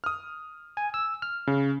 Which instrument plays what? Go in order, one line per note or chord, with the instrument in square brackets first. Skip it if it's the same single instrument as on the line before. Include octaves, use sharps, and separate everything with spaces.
[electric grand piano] D#6 F6
[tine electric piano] G#5
E6
F6
[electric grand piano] C#3